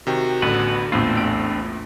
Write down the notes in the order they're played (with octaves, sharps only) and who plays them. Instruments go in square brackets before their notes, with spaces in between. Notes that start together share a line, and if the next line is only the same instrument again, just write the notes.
[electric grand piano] C3 D#3 G5 [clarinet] F#4
[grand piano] A1 [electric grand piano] D2 D3 [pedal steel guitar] B3 B4
[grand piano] A#1 E2 A2 [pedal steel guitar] C4 D4 F4 [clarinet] A4
[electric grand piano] A1 D7